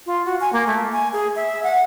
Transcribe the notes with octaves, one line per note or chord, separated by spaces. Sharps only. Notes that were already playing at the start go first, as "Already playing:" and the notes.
F4
F#4
G#5
A#3
A3
G#5
G#4
E5
F#5